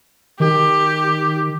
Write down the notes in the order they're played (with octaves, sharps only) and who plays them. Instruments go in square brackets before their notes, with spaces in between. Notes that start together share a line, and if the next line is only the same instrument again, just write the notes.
[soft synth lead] D#3 [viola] G4